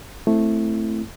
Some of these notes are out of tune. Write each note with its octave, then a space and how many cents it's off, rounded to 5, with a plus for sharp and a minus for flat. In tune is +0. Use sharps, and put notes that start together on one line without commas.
A3 +0 C4 +0 E4 +0